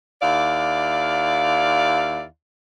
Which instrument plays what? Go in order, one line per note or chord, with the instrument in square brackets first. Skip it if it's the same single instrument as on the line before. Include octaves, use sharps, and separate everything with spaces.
[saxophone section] D#2 E4 D5 F5